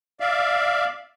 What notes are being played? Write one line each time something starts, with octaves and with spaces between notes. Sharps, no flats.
D5 E5 F5